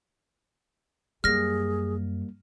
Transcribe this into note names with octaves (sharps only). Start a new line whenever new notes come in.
F#2 G3 A#3 G#4 F6 A#6